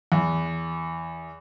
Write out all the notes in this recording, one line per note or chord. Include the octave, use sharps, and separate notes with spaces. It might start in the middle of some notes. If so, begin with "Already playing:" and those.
E2